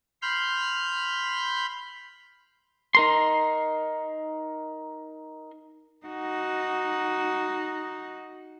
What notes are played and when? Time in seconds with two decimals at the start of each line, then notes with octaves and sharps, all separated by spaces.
0.22 B5 C6 F6 G6
2.95 D#4 A#4 C6
6.06 D#4 F#4